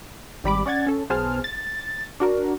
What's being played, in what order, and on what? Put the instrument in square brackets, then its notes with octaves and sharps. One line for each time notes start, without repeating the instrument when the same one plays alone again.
[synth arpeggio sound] G#1 G3 B5 D6
C#4 D5 F#5 G#6 A6
C#4 A4
B1 B3 G#4 C5 A5 F6
A6
D4 F#4 A#4